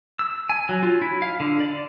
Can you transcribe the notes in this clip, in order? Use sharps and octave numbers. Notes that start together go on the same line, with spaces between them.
E6
G#5
F#3
F4
E4
F5
D3
D5